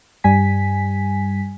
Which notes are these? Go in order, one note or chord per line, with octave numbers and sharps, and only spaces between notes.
G2 G3 G#5 B6